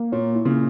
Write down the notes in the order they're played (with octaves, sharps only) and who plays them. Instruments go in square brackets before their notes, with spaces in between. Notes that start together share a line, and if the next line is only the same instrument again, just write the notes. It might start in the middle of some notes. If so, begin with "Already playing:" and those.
Already playing: [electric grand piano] A#3
[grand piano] A#2 [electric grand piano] C#5
[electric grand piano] E4
[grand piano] A#2 C#3